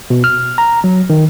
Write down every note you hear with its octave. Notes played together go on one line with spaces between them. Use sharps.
B2
F6
A#5
F#3
D#3